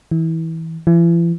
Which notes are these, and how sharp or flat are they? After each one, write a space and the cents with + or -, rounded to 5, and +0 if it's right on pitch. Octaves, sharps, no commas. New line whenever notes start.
E3 -25
E3 +40